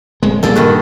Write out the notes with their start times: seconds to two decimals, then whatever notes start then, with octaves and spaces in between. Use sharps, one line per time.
0.23 D1 G#3
0.43 A#2 G3 A#3 G#4 A4
0.55 G2 D#3 F#4